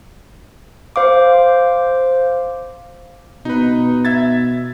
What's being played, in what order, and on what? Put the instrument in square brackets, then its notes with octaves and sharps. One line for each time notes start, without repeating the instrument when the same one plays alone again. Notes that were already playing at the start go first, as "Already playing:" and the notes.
[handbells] C5 F5 D6
[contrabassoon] B2 [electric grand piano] D#4 B4
[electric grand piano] E5 G#6 A6